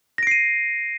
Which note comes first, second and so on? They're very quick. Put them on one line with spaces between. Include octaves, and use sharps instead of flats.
A#6 D7 C7 D#7